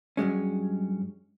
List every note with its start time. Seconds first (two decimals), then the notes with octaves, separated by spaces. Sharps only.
0.17 G2 F#3 G#3 C#4